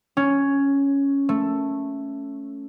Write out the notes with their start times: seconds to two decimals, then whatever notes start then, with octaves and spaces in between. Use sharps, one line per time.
0.17 C#4
1.29 A3